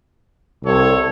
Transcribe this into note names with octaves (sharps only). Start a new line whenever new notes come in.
C2 A4 C#5